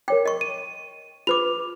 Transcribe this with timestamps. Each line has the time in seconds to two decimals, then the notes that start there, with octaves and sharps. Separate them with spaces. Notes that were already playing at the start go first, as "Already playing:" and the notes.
0.08 A#4 C#5 G5 D6
0.25 D#5 C#6
0.41 D#7
1.27 F4 B4 D6 F7